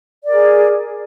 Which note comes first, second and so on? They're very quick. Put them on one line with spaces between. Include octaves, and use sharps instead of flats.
D5 A#4 G#4